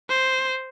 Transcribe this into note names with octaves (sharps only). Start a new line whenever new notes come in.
C5